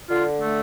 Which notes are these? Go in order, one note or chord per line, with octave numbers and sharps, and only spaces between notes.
D3 F4
A3